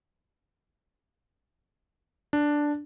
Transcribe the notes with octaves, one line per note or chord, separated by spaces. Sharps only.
D4